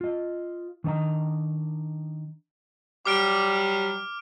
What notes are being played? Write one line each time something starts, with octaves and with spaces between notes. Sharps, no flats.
F4 D#5
D#3 D4 C#5 D#5 A#5
F#3 G3 D6 F6 D7